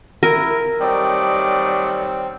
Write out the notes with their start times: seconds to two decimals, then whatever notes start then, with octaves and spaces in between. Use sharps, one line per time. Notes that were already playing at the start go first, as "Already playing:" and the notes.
0.23 E4 A#4
0.80 D#3 F#3 G3 A3 C4 D5 D#5